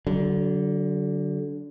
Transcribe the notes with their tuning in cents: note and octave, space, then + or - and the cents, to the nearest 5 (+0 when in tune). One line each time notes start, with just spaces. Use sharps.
D3 -15 F#3 +30